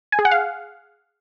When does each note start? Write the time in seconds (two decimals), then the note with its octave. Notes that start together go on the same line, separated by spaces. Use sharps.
0.12 G#5
0.19 G#4
0.25 F#5
0.31 F5